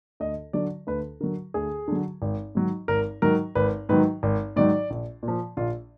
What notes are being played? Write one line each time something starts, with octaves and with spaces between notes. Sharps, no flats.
D2 D#5
D3 F#3 D5
D2 B4
D3 F#3 A#4
D2 G#4
D3 F#3
G#1
G#2 D#3 F#3
G#1 A#4
G#2 D#3 F#3 A#4
G#1 B4
G#2 D#3 F#3 B4
G#1
G#2 D#3 F#3 D5
A#1
A#2
F3
A#1 F4